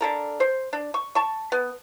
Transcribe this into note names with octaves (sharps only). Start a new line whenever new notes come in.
D3 A4 A#4
C5
D4
C#6
A5 C#6
B3